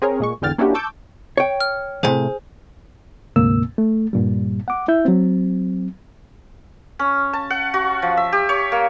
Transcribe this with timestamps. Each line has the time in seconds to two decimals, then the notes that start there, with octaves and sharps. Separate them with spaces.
0.02 C4 G#4 A#4 C#5
0.20 A#2 G#3 C#6
0.42 G#1 E2 D3 G5 F6 A6
0.58 A#3 C#4 D4 E4 F#4 G4
0.74 A5 C#6 D6 E6 G6
1.37 C#5 G5
1.60 F6
2.03 E2 A2 C3 G#4 C5 G#5
3.36 D2 G#2 C3 A#3 E6
3.78 A3
4.13 G2 A#2 G3
4.68 F#5 D6
4.88 E4 E5 G6
5.05 F#3 C4
6.99 C#4
7.33 A5
7.50 F#5
7.74 F#4
8.02 F3
8.17 E5
8.32 G4
8.49 C#5
8.72 A#3